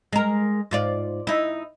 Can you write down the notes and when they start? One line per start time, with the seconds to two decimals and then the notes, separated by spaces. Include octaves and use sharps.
0.13 G#3 A#4
0.71 G#2 F4 D5
1.27 D#4 E4